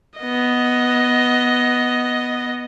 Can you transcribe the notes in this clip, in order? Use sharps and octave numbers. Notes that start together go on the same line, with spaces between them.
B3 D#5